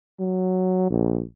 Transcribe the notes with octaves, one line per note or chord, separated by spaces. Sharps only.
F#3
A#1